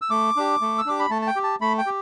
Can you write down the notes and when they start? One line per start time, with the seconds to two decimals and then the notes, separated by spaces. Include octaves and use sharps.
0.02 E6
0.10 A3 D6
0.36 D4 G4
0.61 A3
0.78 E6
0.86 D4 G4 D6
0.99 B5
1.10 A3 A5
1.22 A5
1.27 G5
1.36 G4
1.44 A5
1.61 A3 B5
1.78 G5
1.86 G4